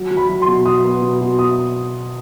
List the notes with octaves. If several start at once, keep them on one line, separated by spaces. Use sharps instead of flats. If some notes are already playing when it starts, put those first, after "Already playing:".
Already playing: F#3
F#3
B5
F#3
C6
B2
F#3 D#6
B3
B2
B2
B2 D#6